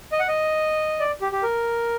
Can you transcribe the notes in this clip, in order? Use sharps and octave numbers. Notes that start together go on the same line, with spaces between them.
D#5
F#5
D#5
D5
G4
G4
A#4